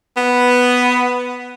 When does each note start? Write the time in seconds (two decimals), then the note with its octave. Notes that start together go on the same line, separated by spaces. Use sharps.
0.17 B3